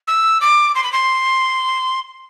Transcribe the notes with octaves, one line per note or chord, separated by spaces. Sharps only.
E6
D6
C6
B5
C6